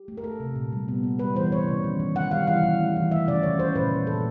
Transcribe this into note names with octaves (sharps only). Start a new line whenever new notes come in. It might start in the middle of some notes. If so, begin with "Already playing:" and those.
Already playing: G4
A3
A#4
A3 A4
C3
A#2
G3
B3
B3
G3 B4
E3 C5
E3 C#5
C#3
D#3
D#3
D#3 F#5
G3 F5
E3 F5
E3
A3
E3
A3 E5
C#3 D5
C#3 C#5
C#3 C5
A#2 B4
A#2
A#2 A4